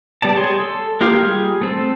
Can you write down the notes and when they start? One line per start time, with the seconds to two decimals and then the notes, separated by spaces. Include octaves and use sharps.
0.22 G3 B3 D5 A5
0.35 G4 G#4 C#5 D#5 C6
0.60 A4
1.01 G#3 A#3 F4 G4 F5
1.23 G3 G#4
1.61 A3 C4 A4